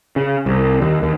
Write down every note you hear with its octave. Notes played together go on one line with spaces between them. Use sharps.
C#3
C2
D#2
D#2